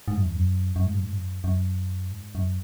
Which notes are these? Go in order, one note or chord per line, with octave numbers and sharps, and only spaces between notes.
G#2
F#2
E2
F#2
F#2
G#2
F#2
G#2
F#2
F#2
G#2
F#2